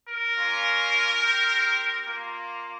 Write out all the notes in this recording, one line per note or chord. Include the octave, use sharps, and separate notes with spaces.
A#4
A#3 C#4 F4
C4 G4
A#3 F4